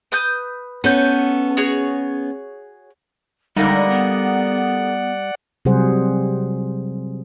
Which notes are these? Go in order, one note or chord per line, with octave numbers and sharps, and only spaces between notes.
B4 D#6 G6
B3 C#4 A4 G6
F#4 G#4 C#5
D3 G3 G#3 A#3 D#4 D5 F#5
B3
C3 F#3 G3 G#4 C5 F#5